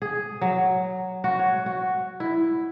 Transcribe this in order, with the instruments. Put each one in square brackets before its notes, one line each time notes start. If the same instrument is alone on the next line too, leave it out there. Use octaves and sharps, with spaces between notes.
[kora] G#4
F#3
F#4
C#5
F#4
E4